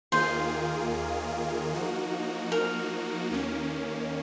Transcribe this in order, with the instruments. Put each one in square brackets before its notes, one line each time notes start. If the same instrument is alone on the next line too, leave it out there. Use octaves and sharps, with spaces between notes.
[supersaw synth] D#2 D#3 A#3 F4 G#4 [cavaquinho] C5
[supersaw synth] F3 A#3 D#4 F#4
[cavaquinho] A#4
[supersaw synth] D#2 D#3 A#3 C#4